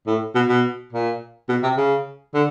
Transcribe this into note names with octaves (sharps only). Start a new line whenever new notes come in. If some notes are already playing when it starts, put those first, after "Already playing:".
A2
B2
B2
A#2
B2
C3
C#3
D3